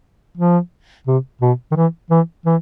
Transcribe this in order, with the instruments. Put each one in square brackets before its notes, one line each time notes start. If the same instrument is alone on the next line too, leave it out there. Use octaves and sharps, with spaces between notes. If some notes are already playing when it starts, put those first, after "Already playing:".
[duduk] F3
C3
B2
D#3
E3
E3
E3